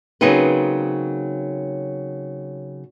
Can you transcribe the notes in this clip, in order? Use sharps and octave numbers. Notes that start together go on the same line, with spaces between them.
C#3 F#3 A#3 C4 D#4 B4